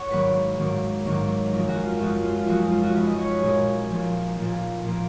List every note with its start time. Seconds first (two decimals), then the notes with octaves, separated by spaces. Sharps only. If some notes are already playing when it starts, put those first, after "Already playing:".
Already playing: C#5 F#5
0.10 G#2 D#3 F#3 A#3 B4
0.58 G#2 D#3 F#3 A#3
1.06 G#2 D#3 F#3 A#3
1.52 F#2 F3 G#3 A#4
1.68 F#4
1.85 F4
2.00 F#2 F3 G#3 F#4
2.24 F4
2.47 F#2 F3 G#3 F#4
2.59 D#4
2.71 F4
2.83 F#4
2.94 F#2 F3 G#3 B4
3.07 D#5
3.18 C#5
3.30 B4
3.42 A#2 F3 A#3 G#4
3.90 A#2 F3 A#3
4.37 A#2 F3 A#3
4.84 A#2 F3 A#3